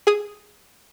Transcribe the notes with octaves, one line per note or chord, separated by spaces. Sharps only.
G#4 D#6